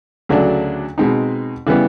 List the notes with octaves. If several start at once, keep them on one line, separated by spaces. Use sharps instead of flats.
D2 C#3 F#3 A3 D4
B2 G#3 C4 D#4
C#3 E3 G3 B3